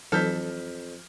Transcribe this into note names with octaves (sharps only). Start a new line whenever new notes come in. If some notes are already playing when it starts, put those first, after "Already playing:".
F2 E3 F#3 D#4 A4 F6 G6 B6